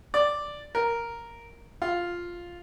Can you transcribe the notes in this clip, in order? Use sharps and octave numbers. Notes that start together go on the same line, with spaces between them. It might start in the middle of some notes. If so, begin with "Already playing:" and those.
D5
A#4
F4